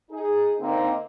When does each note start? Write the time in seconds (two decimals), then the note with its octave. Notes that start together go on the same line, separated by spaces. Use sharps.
0.11 D#4 G#4
0.59 D3 A#3 C4 D#4